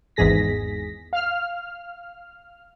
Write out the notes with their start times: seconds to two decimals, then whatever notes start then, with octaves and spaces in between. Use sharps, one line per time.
0.16 G#1 E2 G#2 G#4 A#6 B6
1.13 F5 F6